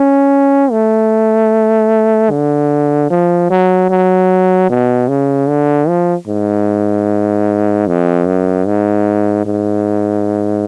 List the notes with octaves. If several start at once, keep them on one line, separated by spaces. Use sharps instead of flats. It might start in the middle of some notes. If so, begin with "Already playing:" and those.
Already playing: C#4
A3
D3
F3
F#3
F#3
B2
C#3
D3
F3
G#2
F2
F#2
G#2
G#2